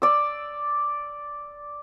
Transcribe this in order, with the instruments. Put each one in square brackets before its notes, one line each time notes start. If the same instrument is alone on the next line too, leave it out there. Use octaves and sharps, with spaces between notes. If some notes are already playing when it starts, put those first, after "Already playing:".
[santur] D5 E6